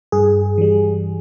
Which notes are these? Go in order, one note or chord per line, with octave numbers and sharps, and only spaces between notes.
G2 G#4
E3 G3